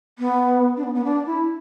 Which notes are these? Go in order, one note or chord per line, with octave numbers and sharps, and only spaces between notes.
B3
D4
B3
B3
D4
E4